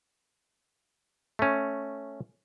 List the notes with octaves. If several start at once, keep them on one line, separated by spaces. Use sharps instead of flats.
A3 C#4